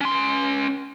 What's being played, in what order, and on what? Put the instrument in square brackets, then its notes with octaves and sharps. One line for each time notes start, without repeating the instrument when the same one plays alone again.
[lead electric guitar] C#4 C6